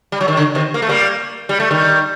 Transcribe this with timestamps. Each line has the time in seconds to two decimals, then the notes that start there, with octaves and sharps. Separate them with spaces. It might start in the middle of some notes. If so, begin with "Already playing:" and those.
0.12 G3
0.21 F#3
0.28 D#3
0.37 D3
0.55 C3 D#3
0.74 A#3
0.82 A3
0.89 G3 A#3
1.49 G3
1.60 A3
1.71 D#3 G3